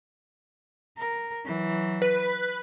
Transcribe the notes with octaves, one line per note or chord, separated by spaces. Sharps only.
A#4
E3 F#3
B4